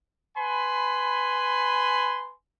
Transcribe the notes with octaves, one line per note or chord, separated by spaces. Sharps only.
B4 G#5 B5 C6